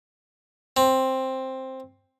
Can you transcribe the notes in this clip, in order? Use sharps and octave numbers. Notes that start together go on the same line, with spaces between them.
C4